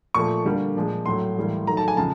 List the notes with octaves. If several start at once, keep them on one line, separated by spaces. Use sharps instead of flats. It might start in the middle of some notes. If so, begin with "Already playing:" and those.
A#2 F3 A3 C#6
D3 G3 A#3
A#2 F3 G#3
A2 F#3 A3 C6
A2 E3 G3 A#3
D#3 F#3 A3 A#5
A5
G#5
C#3 F3 G#3 A5